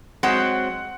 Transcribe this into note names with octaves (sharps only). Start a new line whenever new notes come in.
F#3 G#3 C4 F#5